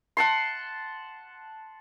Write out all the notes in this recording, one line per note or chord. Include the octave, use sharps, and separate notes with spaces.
F#5 A5 C6